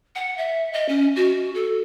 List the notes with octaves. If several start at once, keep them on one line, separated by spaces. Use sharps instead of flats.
F#5
E5
D#5
C#4
F#4
A4